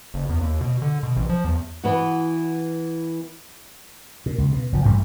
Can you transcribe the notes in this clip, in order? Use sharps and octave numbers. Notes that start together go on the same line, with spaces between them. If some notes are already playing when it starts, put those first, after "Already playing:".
F#1
E2
D#2
B2
D3
B2
A1
F3
E2
E3 B3 F#4
A#2
C#2
B2
F#1 F3
A1 G2 G3 A3